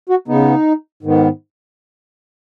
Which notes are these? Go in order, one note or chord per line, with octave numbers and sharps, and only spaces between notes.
F#4
C#3 B3 D#4
G#2 D#3 B3